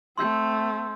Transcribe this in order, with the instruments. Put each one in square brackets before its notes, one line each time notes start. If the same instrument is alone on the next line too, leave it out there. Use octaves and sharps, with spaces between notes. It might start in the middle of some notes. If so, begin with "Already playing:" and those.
[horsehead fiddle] A3 C4 [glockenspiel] C6 E6 G6